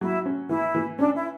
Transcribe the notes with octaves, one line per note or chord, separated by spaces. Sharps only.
F#3 E4
C#4
E3 E4
E3
C#4 D4
E4